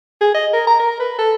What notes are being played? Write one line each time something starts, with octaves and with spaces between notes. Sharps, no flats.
G#4
D#5
A#4
A#5
A#4
B4
A4